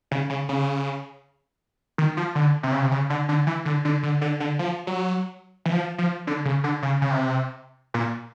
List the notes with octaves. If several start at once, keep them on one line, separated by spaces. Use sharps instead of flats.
C#3
C#3
C#3
D#3
F3
D3
C3
C#3
C3
C#3
D3
D3
E3
D3
D3
D3
D3
D3
F3
F#3
E3
F3
F3
D3
C#3
D3
C#3
C#3
C3
A#2